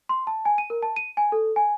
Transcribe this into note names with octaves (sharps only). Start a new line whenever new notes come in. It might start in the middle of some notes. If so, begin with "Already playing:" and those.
C6
A5
G#5
D#7
A#4
A5
D#7
G#5
A4
G#5